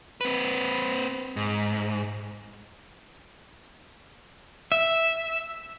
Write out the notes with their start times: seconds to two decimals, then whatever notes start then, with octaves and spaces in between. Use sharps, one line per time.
0.21 C4 B4
1.36 G#2
4.72 E5